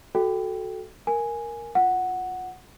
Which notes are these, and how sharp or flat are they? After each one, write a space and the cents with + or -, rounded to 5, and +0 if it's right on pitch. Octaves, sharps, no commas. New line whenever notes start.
F#4 +5 A4 -10 G5 +0
A#4 +0 G#5 +0
F4 +0 F#5 +0